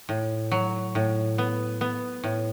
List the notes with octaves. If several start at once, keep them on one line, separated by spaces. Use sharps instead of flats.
A2
F#3
A2
B3
B3
A2